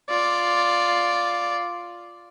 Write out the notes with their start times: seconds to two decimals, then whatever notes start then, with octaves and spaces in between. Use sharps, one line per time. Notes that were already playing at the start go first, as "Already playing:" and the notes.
0.10 F4 D5